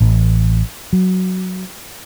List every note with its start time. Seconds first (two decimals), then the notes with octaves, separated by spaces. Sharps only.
0.01 A1
0.93 F#3